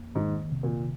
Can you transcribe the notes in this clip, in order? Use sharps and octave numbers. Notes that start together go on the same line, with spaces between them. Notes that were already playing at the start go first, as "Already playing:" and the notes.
Already playing: F2 A#3
G#2 D#3
C3
A#2